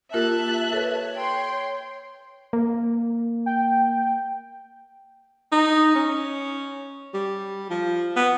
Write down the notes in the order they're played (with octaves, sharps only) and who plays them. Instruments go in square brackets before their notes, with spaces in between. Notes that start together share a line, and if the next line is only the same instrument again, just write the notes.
[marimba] A#3 F4 A#4 [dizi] G4 [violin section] E5 A5 F#6
[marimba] A4 B4 [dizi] C#5
[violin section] G5 C6
[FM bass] A#3
[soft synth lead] G5
[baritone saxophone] D#4
C#4
G3
F3
B3